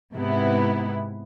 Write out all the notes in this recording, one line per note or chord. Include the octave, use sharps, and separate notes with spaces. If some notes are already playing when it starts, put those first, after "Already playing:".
G#2 C3 B3 E4